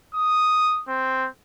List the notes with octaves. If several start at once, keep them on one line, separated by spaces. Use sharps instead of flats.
D#6
C4